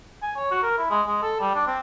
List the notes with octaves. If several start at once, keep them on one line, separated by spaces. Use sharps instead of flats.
G#5
C#5
F#4
A#4
E4
G#3
G#3
A4
G3
D4
C4